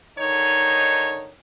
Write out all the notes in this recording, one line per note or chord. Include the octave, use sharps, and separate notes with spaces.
D3 D#3 D#4 C#5